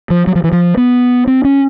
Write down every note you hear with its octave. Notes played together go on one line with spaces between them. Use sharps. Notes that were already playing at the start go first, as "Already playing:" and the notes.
F3
F#3
F3
E3
F3
B3
C4
C#4